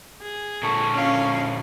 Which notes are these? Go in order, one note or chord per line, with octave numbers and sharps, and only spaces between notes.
G#4
A#2 D3 A4 C#6
C#4 F5